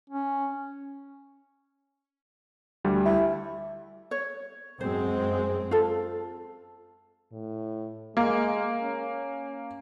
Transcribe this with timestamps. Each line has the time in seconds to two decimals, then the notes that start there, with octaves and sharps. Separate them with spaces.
0.10 C#4
2.84 D2 G3
3.06 E4
4.11 C#5
4.81 F#2 G#3 C4 C5
5.71 F4 A4
7.32 A2
8.17 G#3 A#3
8.82 C#4